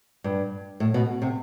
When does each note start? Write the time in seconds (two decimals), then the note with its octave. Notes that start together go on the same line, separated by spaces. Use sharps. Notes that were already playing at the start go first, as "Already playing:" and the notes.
0.24 G2
0.80 A2
0.94 B2
1.22 C3